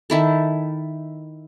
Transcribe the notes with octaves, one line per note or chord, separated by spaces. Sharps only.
D#3 E4 A4